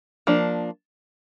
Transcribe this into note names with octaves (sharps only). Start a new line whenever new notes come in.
F3 A#3 D4